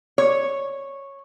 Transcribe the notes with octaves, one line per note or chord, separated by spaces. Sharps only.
C#5